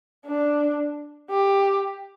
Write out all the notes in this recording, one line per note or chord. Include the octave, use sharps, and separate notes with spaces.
D4
G4